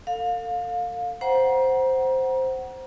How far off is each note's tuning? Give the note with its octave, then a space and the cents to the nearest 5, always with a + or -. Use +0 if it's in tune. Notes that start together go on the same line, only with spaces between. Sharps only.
A4 +40 F5 +25
C5 +0 F#5 +20 A#5 +35